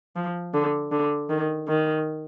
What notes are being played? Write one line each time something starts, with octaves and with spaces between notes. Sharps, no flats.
F3
D3
D3
D#3
D#3